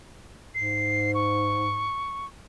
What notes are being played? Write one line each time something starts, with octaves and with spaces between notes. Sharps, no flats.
G#2 C7
C#6